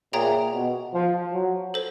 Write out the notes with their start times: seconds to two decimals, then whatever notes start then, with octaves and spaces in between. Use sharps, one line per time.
0.13 A#2 G#4 C#5 E5 G5 A#5
0.53 B2
0.94 F3
1.34 F#3
1.74 A4 C5